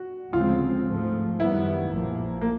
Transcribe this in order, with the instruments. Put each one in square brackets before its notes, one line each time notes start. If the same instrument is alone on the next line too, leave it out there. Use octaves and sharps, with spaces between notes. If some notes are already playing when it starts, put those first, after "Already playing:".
Already playing: [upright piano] F#4
[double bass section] D2 C#3 F3 G#3 C4 [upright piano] F4
[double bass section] G#2 F3 A3
[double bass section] F#2 D#3 G3 B3 [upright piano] E4
[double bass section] A#1 A#2 F3 A#3
[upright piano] A#3